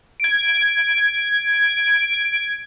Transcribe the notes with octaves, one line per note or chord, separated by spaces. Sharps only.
G#6 D7